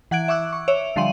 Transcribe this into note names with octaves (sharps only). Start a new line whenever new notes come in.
E3 F#5 F#6 G#6 D7
E5 C#6 D6 E6 F#6
C#6
C#5 E5 D7 F7
D3 F3 G3 C6 D#7 F#7